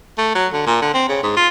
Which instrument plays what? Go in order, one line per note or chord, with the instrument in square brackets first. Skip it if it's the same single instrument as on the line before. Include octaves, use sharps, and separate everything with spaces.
[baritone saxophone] A3
F#3
D3
A#2
D3
C4
C#3
G#2
F4